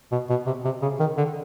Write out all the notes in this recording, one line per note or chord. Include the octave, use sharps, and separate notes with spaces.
B2
B2
C3
C3
C#3
D#3
D3